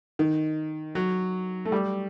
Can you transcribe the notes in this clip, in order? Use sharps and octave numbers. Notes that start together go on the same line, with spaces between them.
D#3
F#3
A3
G3